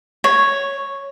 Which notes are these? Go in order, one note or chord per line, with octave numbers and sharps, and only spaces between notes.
C#5